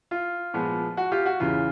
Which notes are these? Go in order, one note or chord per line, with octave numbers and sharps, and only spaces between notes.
F4
A#2 F3 G#3 B3
F#4
F4 G4
F#4
E2 C#3 E3 F4